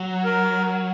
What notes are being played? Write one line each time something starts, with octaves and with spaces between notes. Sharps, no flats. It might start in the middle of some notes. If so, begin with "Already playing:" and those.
Already playing: F#3
A#4